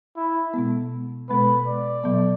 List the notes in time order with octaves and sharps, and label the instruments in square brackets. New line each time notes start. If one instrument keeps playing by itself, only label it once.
[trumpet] E4
[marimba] B2 G#3 B3
[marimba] B2 G#3 B3 [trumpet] B4
[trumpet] D5
[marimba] B2 F#3 B3